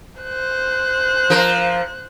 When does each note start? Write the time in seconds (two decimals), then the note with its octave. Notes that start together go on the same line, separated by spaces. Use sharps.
0.22 C5 F#6
1.30 F3 A#4